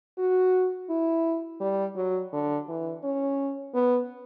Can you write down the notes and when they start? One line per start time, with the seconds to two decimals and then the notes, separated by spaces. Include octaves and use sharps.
0.18 F#4
0.90 E4
1.61 G3
1.96 F#3
2.33 D3
2.68 E3
3.03 C#4
3.74 B3